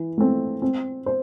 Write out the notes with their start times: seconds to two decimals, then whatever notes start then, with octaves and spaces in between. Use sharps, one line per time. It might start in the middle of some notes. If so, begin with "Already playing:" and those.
Already playing: E3
0.18 A3 C4
0.62 C4
1.06 C5